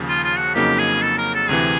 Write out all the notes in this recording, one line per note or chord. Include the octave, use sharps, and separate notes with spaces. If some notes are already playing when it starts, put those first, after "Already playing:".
Already playing: D#2 C#3 F3
F4
F4
F#4
F2 C#3 F#3 A#3 D#4 G4
G#4
A4
A#4
A4
D2 C3 E3 G#4